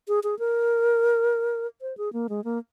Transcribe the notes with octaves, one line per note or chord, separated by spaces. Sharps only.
G#4
G#4
A#4
C5
G#4
A#3
G#3
A#3